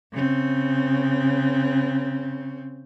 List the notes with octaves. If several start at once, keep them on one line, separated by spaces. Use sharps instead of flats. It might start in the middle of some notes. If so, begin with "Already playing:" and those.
C#3 C4